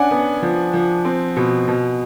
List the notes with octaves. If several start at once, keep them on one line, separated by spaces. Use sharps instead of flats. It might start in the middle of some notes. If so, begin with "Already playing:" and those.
Already playing: C#4 D4 F#5 G#5
B3
F3
F3
C4
B2
B2